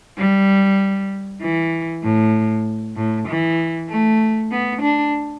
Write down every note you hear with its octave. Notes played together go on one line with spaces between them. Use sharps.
G3
E3
A2
A2
E3
A3
B3
D4